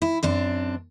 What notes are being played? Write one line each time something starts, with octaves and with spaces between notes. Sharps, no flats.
E4
F#2 C4 D4